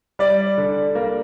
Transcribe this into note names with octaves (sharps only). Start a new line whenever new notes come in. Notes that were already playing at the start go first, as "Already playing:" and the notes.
G3 D5
D3
A#3